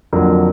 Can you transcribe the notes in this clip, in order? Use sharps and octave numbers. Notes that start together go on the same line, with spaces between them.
F2 D3 F#3 A#3